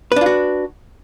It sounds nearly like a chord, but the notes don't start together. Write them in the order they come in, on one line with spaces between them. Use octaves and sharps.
B4 D4 F4 F#4